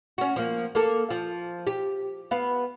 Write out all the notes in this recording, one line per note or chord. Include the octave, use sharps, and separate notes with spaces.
C#4 F#4
F3 A#3
A#3 A4
F3
G4
B3 F5